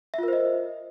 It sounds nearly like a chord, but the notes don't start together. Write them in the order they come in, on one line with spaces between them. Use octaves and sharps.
E5 F4 A#4 C5 D#5